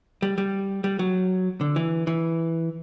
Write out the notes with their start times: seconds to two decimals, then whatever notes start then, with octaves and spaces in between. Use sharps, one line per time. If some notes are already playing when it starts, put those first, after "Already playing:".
0.22 G3
0.38 G3
0.84 G3
0.99 F#3
1.61 D3
1.76 E3
2.07 E3